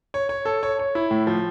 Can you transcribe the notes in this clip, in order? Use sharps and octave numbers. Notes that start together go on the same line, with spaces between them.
C#5
C#5
A4
C#5
C#5
E4
A2
F3